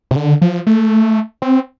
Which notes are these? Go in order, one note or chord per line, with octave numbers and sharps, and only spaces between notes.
C3
D3
F3
A3
C4